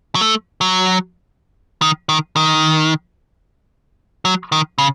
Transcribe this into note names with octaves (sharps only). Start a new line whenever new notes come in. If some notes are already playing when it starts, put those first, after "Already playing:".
F#3
A3
F#3
D#3
D#3
D#3
F#3
D#3
C#3